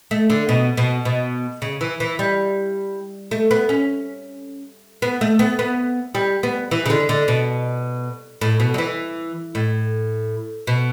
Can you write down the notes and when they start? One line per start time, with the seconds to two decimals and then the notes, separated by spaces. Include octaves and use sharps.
0.11 A3
0.30 D3
0.49 B2
0.77 B2
1.05 B2
1.62 C#3
1.81 E3
2.00 E3
2.19 G3
3.31 A3
3.51 B3
3.69 C#4
5.02 B3
5.21 A3
5.39 B3
5.59 B3
6.15 G3
6.43 B3
6.71 E3
6.86 C#3
6.90 D3
7.09 D3
7.28 B2
8.41 A2
8.60 B2
8.74 F#3
8.78 E3
9.55 A2
10.67 B2